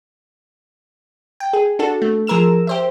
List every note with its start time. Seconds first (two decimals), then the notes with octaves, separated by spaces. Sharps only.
1.40 G5
1.53 G#4
1.79 D4 F#4 A4
2.02 A3
2.27 F3 G#4 A#4 E6 E7
2.67 G4 C5 E5